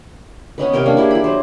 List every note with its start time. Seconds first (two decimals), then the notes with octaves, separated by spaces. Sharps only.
0.58 B3 C#4 D#4 B4
0.73 C3 C#4 A#4 G5
0.86 A#3 D4
0.97 E4 G4 G#4
1.11 E4 B5
1.24 F#3 C5